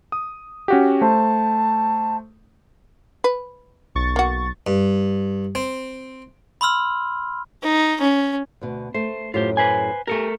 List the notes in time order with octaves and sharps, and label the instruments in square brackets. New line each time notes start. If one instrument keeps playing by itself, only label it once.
[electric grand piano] D#6
C#4 F#4 G4
[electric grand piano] A3 C5 [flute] A5
[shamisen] B4
[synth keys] B1 C#6 A6
[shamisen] A#3 F#4
[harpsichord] G2
C4
[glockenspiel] B5 C6 E6 F6
[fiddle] D#4
C#4
[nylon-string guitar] D2 B2
[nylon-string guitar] A3 [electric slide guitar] C5
[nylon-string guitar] F#2 A2 [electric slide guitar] F4 G4 C5
[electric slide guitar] B4 C5 G#5
[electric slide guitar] A3 A4 A#4 [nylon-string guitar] G4 G#5